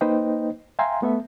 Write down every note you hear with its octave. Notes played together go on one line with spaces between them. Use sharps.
A#3 D#4 B4 C5 D#5 G5
E5 F5 G5 G#5 A#5 C6
A3 B3 A4 E5